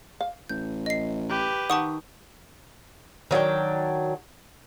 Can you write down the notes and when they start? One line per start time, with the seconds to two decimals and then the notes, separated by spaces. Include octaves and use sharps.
0.21 F5
0.49 A1 G6
0.86 D#5 C7
1.29 G4 B4
1.70 D#3 F#5 A5 C#6 D#6
3.31 D#3 F#3 D4 G5